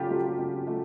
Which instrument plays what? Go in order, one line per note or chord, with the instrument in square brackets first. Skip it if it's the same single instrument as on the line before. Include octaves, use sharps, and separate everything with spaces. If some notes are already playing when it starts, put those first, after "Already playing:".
Already playing: [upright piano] C#3 F#3 A3 [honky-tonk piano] F4 G4
[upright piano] F#3 A3
C#3
F#3 A3